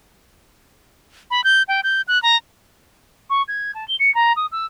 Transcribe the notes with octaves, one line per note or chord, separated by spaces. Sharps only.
B5
G6
G5
G6
F#6
A#5
C#6
G#6
A5
G7
C#7
A#5
D#6
E6